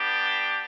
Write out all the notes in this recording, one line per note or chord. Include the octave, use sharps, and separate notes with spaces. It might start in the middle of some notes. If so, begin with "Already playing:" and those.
Already playing: B3 D4 G4